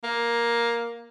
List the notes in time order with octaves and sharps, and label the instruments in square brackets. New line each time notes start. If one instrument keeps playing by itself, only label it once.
[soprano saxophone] A#3